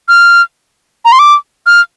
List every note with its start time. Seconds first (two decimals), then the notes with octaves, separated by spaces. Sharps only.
0.09 F6
1.05 A#5
1.12 C6
1.19 D6
1.66 F6